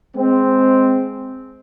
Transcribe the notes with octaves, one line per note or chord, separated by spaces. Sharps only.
G#3 C4